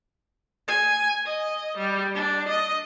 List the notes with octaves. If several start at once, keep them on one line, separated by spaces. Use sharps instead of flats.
G#5
D#5
G3
D4
D#5